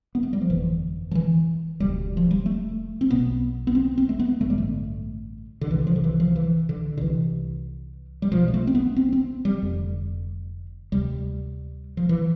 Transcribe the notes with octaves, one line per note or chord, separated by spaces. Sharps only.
B3
A3
G3
F3
G1 F2 D3 E3
F3
E3
E1 D2 D3 G3
F3
G3
A3
C4
B1 B2 B3
B3
C4
C4
A3
B3
A1 G2 D3 A3
G3
A3
D3
C2 C3 E3
F3
D3
E3
F3
E3
D3
D3
C2 C3 E3
G3
B1 B2 F3
G3
A3
C4
B3
C4
C4
G3
F1 F2 D3
D2 C3 G3
F3
E3